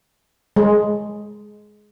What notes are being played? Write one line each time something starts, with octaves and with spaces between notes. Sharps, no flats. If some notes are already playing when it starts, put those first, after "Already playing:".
G#3